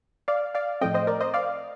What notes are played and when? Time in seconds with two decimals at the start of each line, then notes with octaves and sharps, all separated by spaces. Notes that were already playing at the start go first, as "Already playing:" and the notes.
0.28 D5 F5
0.55 D5 F5
0.81 A2 F3 A3 C4 D#5 G5
0.94 C5 D#5
1.07 A#4 D5
1.21 C5 D#5
1.34 D5 F5